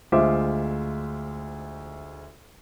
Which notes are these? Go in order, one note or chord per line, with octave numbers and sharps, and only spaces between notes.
D2 G#3 F4 C5 E5 D6